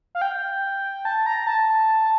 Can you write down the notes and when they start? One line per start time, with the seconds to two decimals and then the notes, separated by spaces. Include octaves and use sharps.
0.15 F5
0.22 G5
1.05 A5
1.26 A#5
1.47 A5